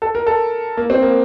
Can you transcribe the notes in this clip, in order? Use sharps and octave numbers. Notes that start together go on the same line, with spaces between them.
A4
A#4
A4
A#3
C4
A#3